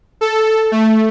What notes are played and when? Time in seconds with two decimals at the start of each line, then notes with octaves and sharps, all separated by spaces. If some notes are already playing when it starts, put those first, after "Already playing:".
0.21 A4
0.72 A3